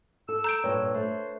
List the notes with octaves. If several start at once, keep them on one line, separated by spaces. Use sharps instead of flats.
A4 E6
A#5 G6 D7
G2 A#2 B4 C#5
A3 C5